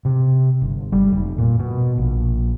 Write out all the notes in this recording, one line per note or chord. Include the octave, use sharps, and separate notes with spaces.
C3
G1
G3
F1
A#2
B2
A#1